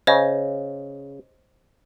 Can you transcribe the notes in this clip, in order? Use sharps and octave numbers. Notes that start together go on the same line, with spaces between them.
C#3 C5 C#5 D#5